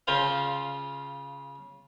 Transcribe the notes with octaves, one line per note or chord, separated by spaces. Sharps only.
C#3 C#4 F4 C5 F5